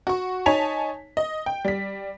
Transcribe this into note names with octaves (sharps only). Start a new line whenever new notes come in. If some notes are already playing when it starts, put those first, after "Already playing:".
F#4 C#6
D#4 C#5 G#5 A5 B6 F7
D#5
G5
G3 B6